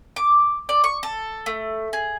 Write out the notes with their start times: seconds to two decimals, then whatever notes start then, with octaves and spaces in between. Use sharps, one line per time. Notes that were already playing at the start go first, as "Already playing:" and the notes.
0.16 D6
0.69 D5
0.84 C#6
1.03 A4
1.46 A3
1.93 G#4